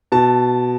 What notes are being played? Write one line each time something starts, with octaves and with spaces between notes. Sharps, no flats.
B2 A5